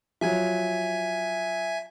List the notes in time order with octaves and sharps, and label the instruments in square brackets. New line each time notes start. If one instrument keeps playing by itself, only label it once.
[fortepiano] F3 F#3 [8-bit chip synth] E5 G#5 G#6